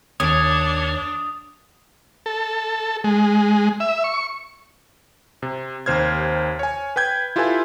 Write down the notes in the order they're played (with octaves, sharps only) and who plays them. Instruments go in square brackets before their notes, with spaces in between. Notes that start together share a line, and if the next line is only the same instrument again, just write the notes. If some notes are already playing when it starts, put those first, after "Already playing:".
[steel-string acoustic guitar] D#2 [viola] D4 [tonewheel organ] C#5 G#6 [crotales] D#6
[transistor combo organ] A4
G#3
E5
C#6
[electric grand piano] C3
D#2 C3 C5 F6 G#6
C#5 G#5
B4 G5 G6 G#6
E4 F4 G4 A4 B4 G#5